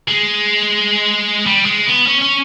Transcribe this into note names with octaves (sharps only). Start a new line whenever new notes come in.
G#3
G3
G#3
B3
C#4
C#4